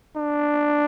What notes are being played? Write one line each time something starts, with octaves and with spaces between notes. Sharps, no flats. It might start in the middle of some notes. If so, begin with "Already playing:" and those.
D4